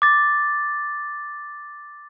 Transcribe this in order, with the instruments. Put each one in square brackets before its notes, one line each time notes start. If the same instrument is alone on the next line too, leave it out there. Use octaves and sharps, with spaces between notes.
[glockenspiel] D6 A6